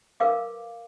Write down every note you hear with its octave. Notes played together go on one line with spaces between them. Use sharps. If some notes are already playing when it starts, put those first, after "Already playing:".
A#4 B4 F5 D6